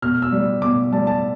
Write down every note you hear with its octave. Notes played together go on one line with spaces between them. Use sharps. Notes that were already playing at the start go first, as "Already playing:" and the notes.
B2 F6
E6
G3
B2 D6
G3 A5
A5